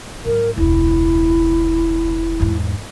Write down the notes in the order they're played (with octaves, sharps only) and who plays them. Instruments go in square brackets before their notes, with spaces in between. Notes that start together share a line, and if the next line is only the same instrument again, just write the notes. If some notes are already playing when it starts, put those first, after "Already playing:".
[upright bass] G#2 F#3 [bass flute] A#4
[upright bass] E1 C#2 [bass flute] E4
[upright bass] E2 G#2